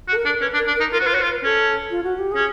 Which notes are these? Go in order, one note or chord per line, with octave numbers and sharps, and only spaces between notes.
F#4
A4
A#4
D4
C#4 B4
D4
A#4
D4
A#4
D#4
F4 A#4
F#4 C5
F4 B4
F#4 C#5
C5
F4
B4
C#4 A4
F4
F#4
G4
C#4 G#4